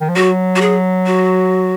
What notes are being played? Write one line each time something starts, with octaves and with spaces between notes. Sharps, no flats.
D#3
F3
F#3 F#4
F#4
G#4
F#4